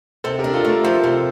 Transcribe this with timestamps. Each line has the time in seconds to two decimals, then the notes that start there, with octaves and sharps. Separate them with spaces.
0.24 C3 A4 C5
0.39 G4 A#4
0.44 D4
0.54 F4 A4
0.65 A3 G4 A#4
0.83 F3 A4 C5
1.04 C3 A4 C5